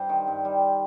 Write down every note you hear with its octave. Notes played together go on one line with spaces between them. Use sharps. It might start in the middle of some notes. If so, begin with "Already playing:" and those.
Already playing: G2 G3 C5
D#3
G2
G3